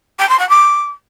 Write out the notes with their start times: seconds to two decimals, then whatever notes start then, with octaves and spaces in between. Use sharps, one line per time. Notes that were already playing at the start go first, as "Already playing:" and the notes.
0.19 G5
0.29 C6
0.39 F#5
0.49 D6